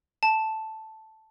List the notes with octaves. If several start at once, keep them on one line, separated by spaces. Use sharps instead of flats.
A5